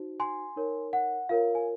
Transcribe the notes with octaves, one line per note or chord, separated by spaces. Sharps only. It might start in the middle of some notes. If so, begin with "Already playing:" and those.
Already playing: D#4 F#4 C5
G#5 C6
D#4 A#4 C#5
F#5
F4 A#4 C#5 F5
G#5